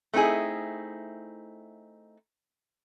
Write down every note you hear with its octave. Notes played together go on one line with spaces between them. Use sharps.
A3 C4 D#4 E4 G#4